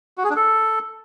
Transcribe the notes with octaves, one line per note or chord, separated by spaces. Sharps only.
F#4
G#4
D4
A4